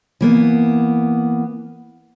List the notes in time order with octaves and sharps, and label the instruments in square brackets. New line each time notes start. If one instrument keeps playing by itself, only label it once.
[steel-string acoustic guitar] E3 A#3 B3